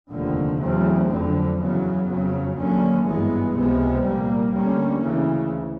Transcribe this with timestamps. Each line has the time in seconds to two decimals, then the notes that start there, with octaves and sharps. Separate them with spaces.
0.10 F1 D#2 D3 F3
0.60 E2 C#3 F#3 A3 C4
1.09 F#1 F2 D3
1.58 E2 C#3 F#3 B3
2.07 F#1 F2 C#3 F#3
2.56 D#2 D3 F#3 A#3 C#4
3.05 G#1 G2 E3 G#3 B3
3.54 C#2 C3 F3 G#3 B3
4.03 C2 A#2 G3 A#3
4.52 D2 D3 G3 A#3 C#4
5.01 D2 C#3 E3